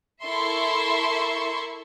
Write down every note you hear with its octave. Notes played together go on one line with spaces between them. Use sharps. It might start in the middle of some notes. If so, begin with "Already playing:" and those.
E4 A4 A#4 E5 C6 C#6